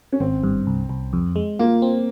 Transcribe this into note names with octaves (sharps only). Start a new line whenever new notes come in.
C#4
G#1 C4
G2
C2
C2
F2
G#3
A#3 F4
C4